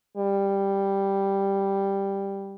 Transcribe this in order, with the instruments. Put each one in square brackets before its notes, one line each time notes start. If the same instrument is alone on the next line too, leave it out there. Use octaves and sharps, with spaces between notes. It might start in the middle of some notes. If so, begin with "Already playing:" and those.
[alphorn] G3